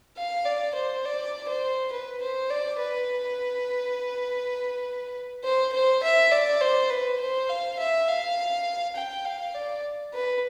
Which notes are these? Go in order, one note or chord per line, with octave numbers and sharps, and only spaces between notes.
F5
D5
C5
D5
C5
B4
C5
D5
B4
C5
C5
E5
D5
C5
B4
C5
F5
E5
F5
G5
F5
D5
B4